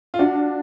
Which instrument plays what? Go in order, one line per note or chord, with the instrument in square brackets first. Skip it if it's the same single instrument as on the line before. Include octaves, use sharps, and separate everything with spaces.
[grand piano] F4
[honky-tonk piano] D4 [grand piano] F#4